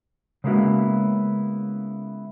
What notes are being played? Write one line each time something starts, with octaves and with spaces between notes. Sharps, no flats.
C#3 G#3 A#3 B3 E4 F#4